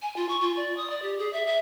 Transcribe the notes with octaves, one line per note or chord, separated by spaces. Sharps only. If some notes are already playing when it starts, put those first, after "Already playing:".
G#5
F4
C#6
F4
D5
D#6
D5
G4
G#4
E5
E5